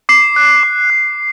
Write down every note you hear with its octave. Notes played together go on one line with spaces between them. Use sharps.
D6 C7
F#6
D6
F#6